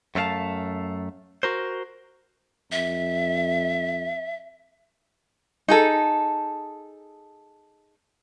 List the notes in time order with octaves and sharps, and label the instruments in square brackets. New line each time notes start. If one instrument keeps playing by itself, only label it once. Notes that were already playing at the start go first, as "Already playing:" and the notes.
[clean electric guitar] F#2 A3 C4 A4 F5 A5
F#4 A#4 C5
[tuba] F2 [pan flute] E5
[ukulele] D#4 G#4 A4